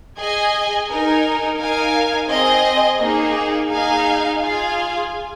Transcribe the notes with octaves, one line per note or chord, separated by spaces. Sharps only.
G#4 D#5 G#5
D#4 A#4 G#5
D#4 A#4 F5 G#5
C4 G#4 D#5 G#5
A#3 D#4 G#4
D#4 G#4 F5 G#5
F4 G#4 F5 G#5